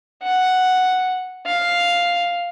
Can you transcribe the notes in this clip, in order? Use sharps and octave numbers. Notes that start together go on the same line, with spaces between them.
F#5
F5